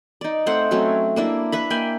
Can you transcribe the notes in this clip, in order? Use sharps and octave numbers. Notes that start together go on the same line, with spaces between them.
D#4 D5
A3 C4 C5 F#5
F#3 A3 C4 C#4
A#3 D4 E4
B4 E5 B5
A#3 G5 G#5 B5